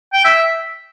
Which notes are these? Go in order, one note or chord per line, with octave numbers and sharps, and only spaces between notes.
G5
E5